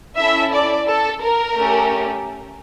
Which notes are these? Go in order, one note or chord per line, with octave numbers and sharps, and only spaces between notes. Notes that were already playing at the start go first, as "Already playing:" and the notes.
C#4 E4 A4 E5
D5
A4
A#4
A3 C#4 G4